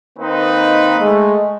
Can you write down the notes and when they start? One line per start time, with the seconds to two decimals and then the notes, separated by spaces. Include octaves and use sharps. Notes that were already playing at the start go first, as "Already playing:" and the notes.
0.18 D#3 A#3 C4 D#4 B4
0.99 G#3 A3